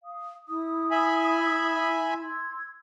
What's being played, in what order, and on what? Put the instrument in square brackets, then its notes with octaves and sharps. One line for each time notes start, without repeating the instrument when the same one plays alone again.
[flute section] F5 D#6
[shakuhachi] E4 [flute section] D#6
[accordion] E5 G#5 B5
[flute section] C6 E6 G#6